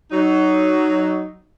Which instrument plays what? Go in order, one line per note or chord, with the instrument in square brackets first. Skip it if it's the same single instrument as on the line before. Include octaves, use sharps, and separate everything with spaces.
[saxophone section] F#3 D#4